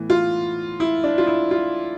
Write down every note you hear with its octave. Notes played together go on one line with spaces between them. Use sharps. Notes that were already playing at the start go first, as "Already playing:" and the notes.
Already playing: A2 E3 B3
F4
E4
D4
F4
E4
F4